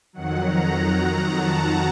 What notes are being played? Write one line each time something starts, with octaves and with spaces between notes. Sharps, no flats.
F2 D#3 F#3 F#5
A#5
A5